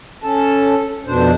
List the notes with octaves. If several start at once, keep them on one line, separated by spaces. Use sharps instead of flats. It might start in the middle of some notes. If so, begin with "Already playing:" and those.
C#4 A4 A5
F2 B2 D4 C5